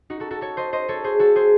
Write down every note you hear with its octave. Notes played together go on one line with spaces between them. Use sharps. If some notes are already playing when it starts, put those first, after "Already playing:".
D#4 F#4
F#4 A4
F#4 A4
A4 C#5
C5 D#5
C5 D#5
A4 C#5
G#4 C5
F#4 A4
G#4 C5